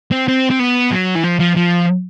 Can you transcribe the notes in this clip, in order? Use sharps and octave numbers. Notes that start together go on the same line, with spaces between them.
C4
C4
C4
B3
F#3
E3
F3
F3
F3